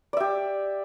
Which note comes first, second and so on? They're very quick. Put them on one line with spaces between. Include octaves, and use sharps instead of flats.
D5 E5 G4